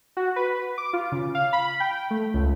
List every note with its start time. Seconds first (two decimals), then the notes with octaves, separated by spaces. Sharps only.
0.17 F#4
0.36 B4
0.78 D6
0.93 F4
1.12 C#3
1.35 F5
1.53 B5
1.80 G5
2.11 A3
2.34 C#2